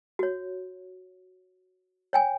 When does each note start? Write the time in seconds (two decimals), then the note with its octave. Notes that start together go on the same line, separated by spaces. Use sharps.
0.19 F#4 C#5
2.13 C#5 G5 G#5